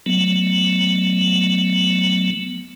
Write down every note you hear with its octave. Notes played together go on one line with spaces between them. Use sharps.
F#3 A3 B3